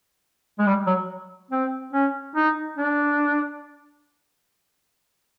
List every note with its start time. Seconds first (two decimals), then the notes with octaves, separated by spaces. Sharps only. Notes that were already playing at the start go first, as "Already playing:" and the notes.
0.59 G#3
0.66 G3
0.87 F#3
1.51 C4
1.93 C#4
2.36 D#4
2.78 D4